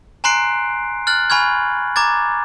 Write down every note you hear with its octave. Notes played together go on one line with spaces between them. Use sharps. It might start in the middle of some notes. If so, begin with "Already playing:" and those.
G#5 A#5 C6 F#6 C7 D7
F6 F#6 A6 F#7
G#5 B5 C#6 F6 G#6
A#5 D6 G#6 A6